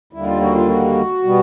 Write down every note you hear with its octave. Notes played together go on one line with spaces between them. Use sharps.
D#2 D3 G3 A#3 E4
F4
F#4
F4
F#4
B2 G3 B3